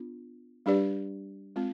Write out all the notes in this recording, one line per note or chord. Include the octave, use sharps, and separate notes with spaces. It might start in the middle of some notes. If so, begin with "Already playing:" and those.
Already playing: B3 D4 F4
G3 D4 G4 B4 D5
G#3 C4 F4